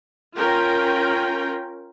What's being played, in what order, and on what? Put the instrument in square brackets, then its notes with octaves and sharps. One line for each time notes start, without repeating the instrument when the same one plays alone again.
[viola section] C#4 F4 A#4 G5